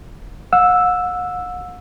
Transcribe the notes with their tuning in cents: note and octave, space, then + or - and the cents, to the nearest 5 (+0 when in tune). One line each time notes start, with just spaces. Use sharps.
F#5 -45 E6 +0